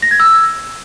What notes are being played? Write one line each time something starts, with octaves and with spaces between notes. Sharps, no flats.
A#6
G#6
E6